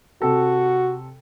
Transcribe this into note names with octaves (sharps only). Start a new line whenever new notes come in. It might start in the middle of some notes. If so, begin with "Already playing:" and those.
C3 F#4 A4